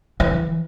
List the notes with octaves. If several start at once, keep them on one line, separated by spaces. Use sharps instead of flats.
E3